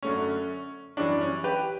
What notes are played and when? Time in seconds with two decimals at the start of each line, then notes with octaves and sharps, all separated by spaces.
0.02 F#2 D3 A3 C#4
0.97 F#2 E3 G3 C#4 D4
1.21 C#4
1.44 G4 B4